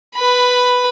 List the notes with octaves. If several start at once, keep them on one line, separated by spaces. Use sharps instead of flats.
B4 B5